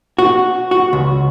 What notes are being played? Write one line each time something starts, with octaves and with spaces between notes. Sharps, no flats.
F#4
F#4
C#2